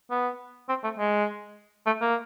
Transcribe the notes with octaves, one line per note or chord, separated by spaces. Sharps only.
B3
C4
A3
G#3
A3
A#3